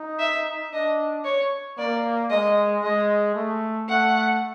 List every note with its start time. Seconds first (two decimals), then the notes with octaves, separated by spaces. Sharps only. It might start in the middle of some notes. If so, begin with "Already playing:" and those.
Already playing: D#4
0.19 E5
0.72 D4 D#5
1.25 C#5
1.78 A#3 D5
2.31 G#3 D#5
2.83 G#3 D#5
3.35 A3
3.88 A3 F#5